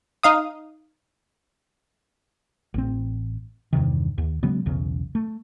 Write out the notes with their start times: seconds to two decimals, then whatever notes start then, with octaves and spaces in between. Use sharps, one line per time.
0.23 D#4 F5 D#6
2.74 A1 C4
3.73 E2 G2 C3 D#3
4.18 D#2
4.43 C#3 F#3 G#3 B3
4.66 B1 E2 C#3
5.15 A3